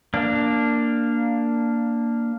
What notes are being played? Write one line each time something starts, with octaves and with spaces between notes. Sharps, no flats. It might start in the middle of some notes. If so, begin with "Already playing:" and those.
A#3 D4